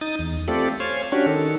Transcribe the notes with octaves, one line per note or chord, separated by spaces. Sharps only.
D#4 D#6 A6
E2
A3 C4 F4 G4 A4 D5
C5 C#5 F5 G#5
C#4 D4 F#4 G4 C#5
D#3 A4